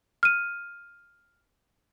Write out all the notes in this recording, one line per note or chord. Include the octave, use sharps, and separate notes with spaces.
F6 D#7